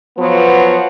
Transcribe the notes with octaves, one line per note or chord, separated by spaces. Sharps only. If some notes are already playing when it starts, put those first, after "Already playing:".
F3 F#3 B3